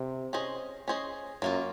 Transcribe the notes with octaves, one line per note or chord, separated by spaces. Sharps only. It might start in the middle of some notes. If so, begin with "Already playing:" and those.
Already playing: C3
C#4 G#4 C5 D#5
C#4 G#4 C5 D#5
F#2 F#3 A#3 F4